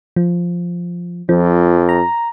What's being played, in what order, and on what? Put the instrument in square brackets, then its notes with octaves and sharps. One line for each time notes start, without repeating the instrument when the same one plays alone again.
[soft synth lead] F3
[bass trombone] F2 [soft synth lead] F3
[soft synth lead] A#5